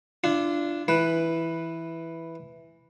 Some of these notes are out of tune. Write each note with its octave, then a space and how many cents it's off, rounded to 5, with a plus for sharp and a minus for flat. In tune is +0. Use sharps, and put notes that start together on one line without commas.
D4 +0 F4 -35
E3 +0 B4 +0